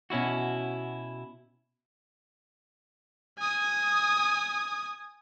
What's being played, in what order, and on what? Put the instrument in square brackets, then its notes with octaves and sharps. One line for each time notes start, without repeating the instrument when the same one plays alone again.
[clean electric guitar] B2 C#4 E4 F#4
[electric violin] G#5 D#6